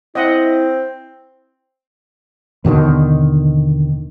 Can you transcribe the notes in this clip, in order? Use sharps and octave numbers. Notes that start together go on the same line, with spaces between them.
C4 E4 D#5 E5 F#5
D#2 B2 D3 D#3